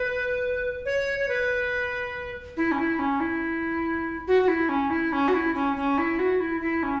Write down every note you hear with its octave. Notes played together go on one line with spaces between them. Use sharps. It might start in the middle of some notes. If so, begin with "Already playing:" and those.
Already playing: B4
C#5
C#5
B4
E4
C#4
E4
C#4
E4
F#4
F#4
E4
C#4
E4
C#4
F#4
E4
C#4
C#4
E4
F#4
E4
E4
C#4